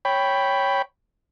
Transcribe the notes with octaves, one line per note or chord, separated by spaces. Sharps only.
C#5 G5 B5